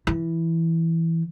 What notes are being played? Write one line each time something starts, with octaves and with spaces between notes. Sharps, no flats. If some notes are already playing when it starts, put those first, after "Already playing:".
E3